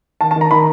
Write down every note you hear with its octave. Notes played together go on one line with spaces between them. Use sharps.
D#3 A5
A5
D#3
A#5
D#3 B5